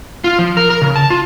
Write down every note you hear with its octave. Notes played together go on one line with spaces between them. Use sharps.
F4
F3
A#4
A#4
C#3
A5
F4